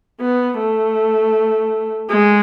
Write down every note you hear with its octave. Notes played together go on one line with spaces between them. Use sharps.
B3
A3
G#3